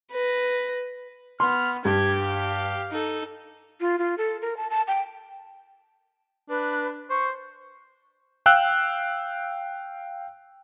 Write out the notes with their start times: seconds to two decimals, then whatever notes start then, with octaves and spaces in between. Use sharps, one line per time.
0.12 B4 A#6
1.40 B3 C6 F6
1.85 G2 G4 G#6
2.21 F5
2.91 D#4 A4
3.81 F4
3.99 F4
4.18 A4
4.42 A#4
4.57 A5
4.70 A5
4.88 G5
6.49 D4 B4
7.10 C5 C#6
8.46 F5 G5 E6 F#6